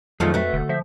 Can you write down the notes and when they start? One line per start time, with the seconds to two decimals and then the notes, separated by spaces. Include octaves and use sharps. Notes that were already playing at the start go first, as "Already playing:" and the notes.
0.20 F2 D#3 F3 F#3 A3 F4 G#4 A4
0.34 A3 F#4 B4 E5
0.53 E1 D3
0.69 F3 C5 E5